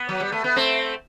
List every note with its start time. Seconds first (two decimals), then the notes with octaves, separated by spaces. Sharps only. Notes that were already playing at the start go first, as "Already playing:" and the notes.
Already playing: B3
0.09 F#3
0.20 G3
0.32 A3
0.44 B3
0.56 A3 C4